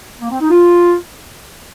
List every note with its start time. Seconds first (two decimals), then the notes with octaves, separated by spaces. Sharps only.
0.21 A#3
0.31 C4
0.40 D#4
0.50 F4